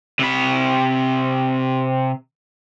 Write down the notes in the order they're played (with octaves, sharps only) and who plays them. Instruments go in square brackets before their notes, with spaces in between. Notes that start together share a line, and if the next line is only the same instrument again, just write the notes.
[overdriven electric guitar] C3 B5